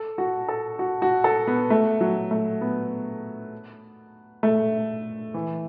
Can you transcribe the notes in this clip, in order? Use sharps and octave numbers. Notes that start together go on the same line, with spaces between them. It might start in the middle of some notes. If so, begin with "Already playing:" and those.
Already playing: A4
F#4
A4
F#4
F#4
A4
B3
A3
F#3
A3
B3
A3
E3